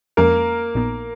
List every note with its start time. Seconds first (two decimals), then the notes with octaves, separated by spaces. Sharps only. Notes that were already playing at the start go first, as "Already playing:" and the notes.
0.17 F2 F3 G#3 A#3 C#4 A#4
0.75 A#1 A#2 F3 B3 D#4